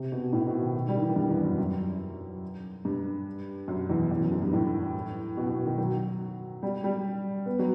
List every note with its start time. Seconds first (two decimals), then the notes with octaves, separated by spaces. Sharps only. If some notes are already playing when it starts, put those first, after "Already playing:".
Already playing: C3
0.12 B2
0.32 A2
0.47 B2
0.61 D#3
0.88 G3
0.96 D#3
1.02 E3
1.16 G2
1.30 E2
1.44 F#2
1.58 F#2
2.85 G2
3.68 F#2
3.90 E2
4.11 E2
4.21 F#2
4.32 F#2
4.42 G2
4.53 A2
5.37 B2
5.50 B2
5.65 D#3
5.78 F#3
6.63 G3
6.84 G3
7.46 B3
7.59 F#3